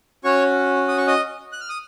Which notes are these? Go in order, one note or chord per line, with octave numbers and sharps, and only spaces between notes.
C#4 F#4 C#5 C#6
D#6
C#6
D#5 D#6
F#6
F6
D#6